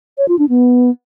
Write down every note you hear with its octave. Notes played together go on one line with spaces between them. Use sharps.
C#5
F4
D4
B3